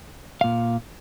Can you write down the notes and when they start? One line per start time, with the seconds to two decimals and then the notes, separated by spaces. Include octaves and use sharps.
0.41 A#2 F5